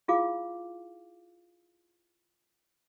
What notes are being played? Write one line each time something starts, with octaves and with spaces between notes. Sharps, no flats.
E4 F4 G#4 F5 D6